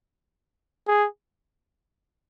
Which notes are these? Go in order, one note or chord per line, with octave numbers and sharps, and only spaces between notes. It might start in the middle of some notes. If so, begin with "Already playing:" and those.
G#4